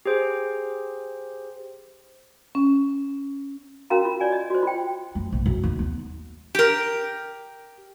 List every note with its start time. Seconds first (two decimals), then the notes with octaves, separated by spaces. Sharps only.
0.06 G4 G#4 C5
2.55 C#4
3.90 C#4 F#4 A#4 F5 A#5
4.05 F4
4.20 C#5 D5 G#5
4.32 D#5
4.50 F#4 C5
4.63 F4 G5
5.15 F#2
5.32 A#1
5.46 F#2
5.64 D#2
5.79 B3
6.55 G4 A#4